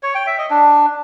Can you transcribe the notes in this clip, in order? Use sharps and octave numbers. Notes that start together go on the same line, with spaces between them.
C#5
G5
E5
D#5
D4